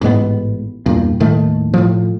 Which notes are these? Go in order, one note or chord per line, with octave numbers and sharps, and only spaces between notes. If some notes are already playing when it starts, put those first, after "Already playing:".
A1 G#2 G#3 B3
E2 G2 A#2
D#1 A2 D#3 A3
A2 F3